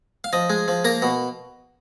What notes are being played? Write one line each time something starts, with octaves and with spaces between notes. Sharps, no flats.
F5
F3 D#5
G#3
F3
A#3 A#5
B2